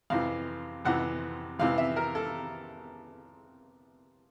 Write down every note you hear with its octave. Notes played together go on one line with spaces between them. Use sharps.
F2 C3 E3 F5
F2 C3 E3 F#5
F2 C3 E3 F5
E5
A#4
A4